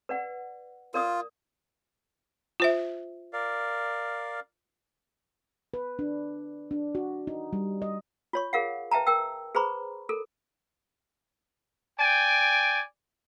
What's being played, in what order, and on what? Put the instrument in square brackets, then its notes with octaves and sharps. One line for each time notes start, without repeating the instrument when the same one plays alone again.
[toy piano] B4 D5 F#5
[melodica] F4 [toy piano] A#4 D5 D#6
[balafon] F4 C5 E5
[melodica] A#4 D5 F5
[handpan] B4
D4
D4
F#4
D#4
G3
D#5
[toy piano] F4 C#5 C#6
G#4 A#4 F5 F#5
B4 E5 G5 A5 A#5
A#4 G5 E6
G#4 B4 C5 A#5 B5 C#6
A4 A#4
[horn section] D5 G5 G#5